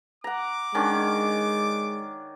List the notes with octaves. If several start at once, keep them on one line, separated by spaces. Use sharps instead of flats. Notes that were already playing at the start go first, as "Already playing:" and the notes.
F#5 A#5 D6
D#3 G#3 C#4 D4